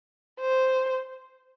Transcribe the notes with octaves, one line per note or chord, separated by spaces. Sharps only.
C5